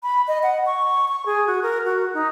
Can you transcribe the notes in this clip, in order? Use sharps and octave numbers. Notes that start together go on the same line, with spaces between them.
B5
D#5
F#5
C#6
C#6
G#4
F#4
A#4
F#4
D#4